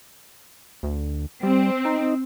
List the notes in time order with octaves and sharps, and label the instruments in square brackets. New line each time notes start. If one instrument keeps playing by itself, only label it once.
[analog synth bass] D2
[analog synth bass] G3 [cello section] C4
[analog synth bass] D#4